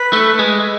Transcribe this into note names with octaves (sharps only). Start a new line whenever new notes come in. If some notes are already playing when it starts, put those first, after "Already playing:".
Already playing: B4
A3
G#3